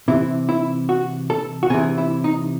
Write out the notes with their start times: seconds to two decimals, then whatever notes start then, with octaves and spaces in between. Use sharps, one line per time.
0.08 C3 E3 E4
0.49 E4
0.89 F#4
1.30 A4
1.63 F#4
1.70 C3 G#4
1.74 E3
1.98 E4
2.24 D#4